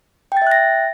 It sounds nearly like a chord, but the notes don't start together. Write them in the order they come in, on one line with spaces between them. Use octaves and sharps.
G5 A6 E5 F#6 A#6